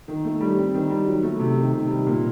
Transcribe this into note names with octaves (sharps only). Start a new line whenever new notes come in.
D#3
A3
G3
C4
D#3
G3
F#3
A3
C3
D#3
C3
G3
A#2